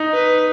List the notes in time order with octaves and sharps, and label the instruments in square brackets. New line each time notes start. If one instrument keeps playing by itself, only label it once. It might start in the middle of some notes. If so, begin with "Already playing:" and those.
Already playing: [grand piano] D#4
[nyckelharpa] B4